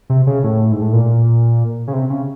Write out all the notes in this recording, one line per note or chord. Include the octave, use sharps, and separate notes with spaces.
C3
C#3
A2
G#2
A2
A#2
C#3
C3
C#3